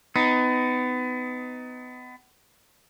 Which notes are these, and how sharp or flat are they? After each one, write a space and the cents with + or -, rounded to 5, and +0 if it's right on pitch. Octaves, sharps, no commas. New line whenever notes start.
B3 +30 D#4 +10